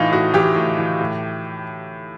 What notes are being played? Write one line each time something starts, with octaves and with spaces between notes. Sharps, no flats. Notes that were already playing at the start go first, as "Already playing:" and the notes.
Already playing: A2 E3 D#4 F4
A2 F#4
E3 G4
A2
E3
A2